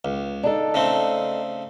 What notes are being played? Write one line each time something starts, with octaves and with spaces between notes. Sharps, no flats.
C#2
D4 D#4 A4
C#3 A3 C4